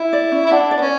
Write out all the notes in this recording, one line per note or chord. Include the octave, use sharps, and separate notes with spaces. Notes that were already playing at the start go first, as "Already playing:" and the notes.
Already playing: E4
D5
C#4
E4
D4 F#5
D5
B3
C#4